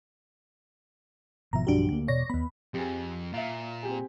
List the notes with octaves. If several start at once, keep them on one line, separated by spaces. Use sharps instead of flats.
G#1 B2 F3 E5 A#5
B1 G2 F3 D4 F#4 G4
D2 A#3
E1 B2 C#5 D5 A#6
D#2 B3 B5
F2 G4 G#4
A#2 E5 F5
C4 G4 G#4